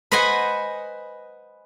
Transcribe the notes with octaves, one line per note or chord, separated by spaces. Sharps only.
B4 C5 D#5 F#5 G#5